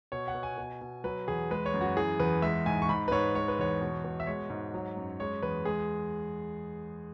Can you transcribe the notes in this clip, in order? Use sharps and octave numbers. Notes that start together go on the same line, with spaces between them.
B2 C#5
F#5
B2
G#5
B2
B2
F#3 B4
E2 G#4
G#3 B4
C#5
F#2
F#4
E3 G#4
E2 B4
G#3 E5
G#2 G#5
C#6
G#2 B5
B4
G#2 C#5
G#3 C#5
B4
E2 C#5
B2
B2
E5
G#3 C#5
G#2
F#3
F#2
G#3 C#5
E2 B4
G#3 G#4